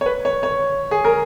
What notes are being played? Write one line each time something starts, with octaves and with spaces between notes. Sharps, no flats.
C#5
B4
C#5
C#5
G#4
A#4